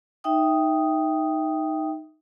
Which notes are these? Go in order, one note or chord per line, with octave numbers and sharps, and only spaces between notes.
D#4 E5 G5 D#6